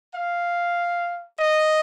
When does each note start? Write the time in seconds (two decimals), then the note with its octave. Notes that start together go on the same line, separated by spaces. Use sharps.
0.15 F5
1.39 D#5